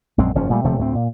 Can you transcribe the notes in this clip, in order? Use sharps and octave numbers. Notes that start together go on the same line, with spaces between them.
A#1 F#2 G#3 C4
F#1 G#2 F3 C#4
A#2 G3 A3
D#1 C3 F3 A3
D2 A2 C4
A#2